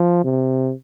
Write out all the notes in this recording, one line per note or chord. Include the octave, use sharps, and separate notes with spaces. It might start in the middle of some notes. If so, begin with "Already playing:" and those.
Already playing: F3
C3